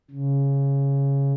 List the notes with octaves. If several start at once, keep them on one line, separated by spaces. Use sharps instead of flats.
C#3